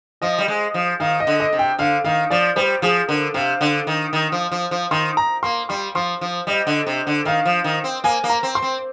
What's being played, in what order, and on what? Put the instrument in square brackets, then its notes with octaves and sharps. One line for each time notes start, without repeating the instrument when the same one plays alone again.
[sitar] F3 [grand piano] D#5
[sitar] G3
G#3
F3
[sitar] D#3 [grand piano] F5
[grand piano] D#5
[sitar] D3
[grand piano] D#5
[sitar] C3
[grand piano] G5
[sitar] D3 [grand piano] F5
[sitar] D#3 [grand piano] F5
[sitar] F3 [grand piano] D5
[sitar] G3 [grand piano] C5
[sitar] F3 [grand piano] G#4
[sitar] D3 [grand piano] A#4
[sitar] C3 [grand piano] F5
[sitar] D3
D#3
D#3
F3
F3
F3
[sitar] D#3 [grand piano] C6
[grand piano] A#5
[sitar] A#3 [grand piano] C6
[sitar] G3 [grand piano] C6
[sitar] F3 [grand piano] C6
[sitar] F3
[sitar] G3 [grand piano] D#5
[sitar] D3
C3
D3
[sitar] D#3 [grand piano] F5
[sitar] F3
D#3
C4
[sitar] A#3 [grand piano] G#5
[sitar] A#3
[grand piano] A#5
[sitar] C4
[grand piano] C6
[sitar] C4